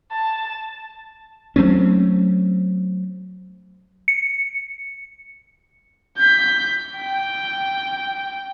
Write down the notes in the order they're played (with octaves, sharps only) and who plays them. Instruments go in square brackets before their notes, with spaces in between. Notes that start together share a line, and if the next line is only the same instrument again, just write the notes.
[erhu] A5
[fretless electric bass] F#3 A3 C4 C#4
[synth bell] C#7
[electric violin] G6 B6
G5